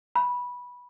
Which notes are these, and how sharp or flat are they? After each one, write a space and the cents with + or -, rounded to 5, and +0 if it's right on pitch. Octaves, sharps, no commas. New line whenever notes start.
B5 -15